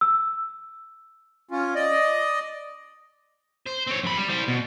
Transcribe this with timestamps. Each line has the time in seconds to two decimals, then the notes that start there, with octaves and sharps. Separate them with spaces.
0.01 E6
1.51 C#4 F4
1.75 D5 D#5
3.67 C5
3.87 C4 C#5
4.04 F#2 B5
4.17 G3
4.29 G3 C5
4.48 B2